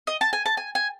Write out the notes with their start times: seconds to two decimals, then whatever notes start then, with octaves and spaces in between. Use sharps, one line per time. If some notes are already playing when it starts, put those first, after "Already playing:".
0.07 D#5
0.21 A5
0.33 G#5
0.46 A5
0.57 G#5
0.75 G#5